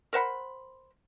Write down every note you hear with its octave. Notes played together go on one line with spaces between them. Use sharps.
A#4 C5 F#5 B5